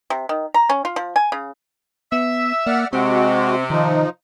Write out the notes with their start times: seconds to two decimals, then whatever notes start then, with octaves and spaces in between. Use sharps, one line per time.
0.10 C3
0.29 D#3
0.54 A#5
0.70 C#4
0.85 F4
0.96 F3
1.16 G#5
1.32 C#3
2.12 B3 E5
2.67 A#3 D5 F#5 F6
2.93 C3 G#3 C4 F#4
3.70 D#3 F3 D#4